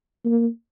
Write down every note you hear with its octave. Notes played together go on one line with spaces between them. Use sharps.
A#3